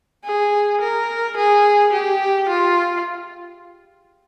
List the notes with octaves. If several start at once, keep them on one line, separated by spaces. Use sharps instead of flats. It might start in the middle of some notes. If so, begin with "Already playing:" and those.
G#4
A#4
G#4
G4
F4